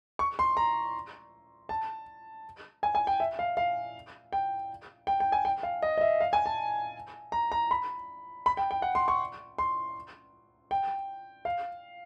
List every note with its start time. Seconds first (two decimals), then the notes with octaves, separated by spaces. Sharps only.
0.19 C#6
0.39 C6
0.57 A#5
1.69 A5
2.83 G#5
2.95 G#5
3.07 G5
3.20 E5
3.39 F5
3.57 F5
4.33 G5
5.07 G5
5.20 G5
5.32 G#5
5.45 G5
5.63 F5
5.82 D#5
5.98 D#5
6.01 E5
6.21 F5
6.33 G#5
6.46 A5
7.32 A#5
7.52 A#5
7.71 B5
8.46 B5
8.57 G5
8.71 G5
8.82 F#5
8.95 C6
9.08 C#6
9.58 C6
10.71 G5
11.45 F5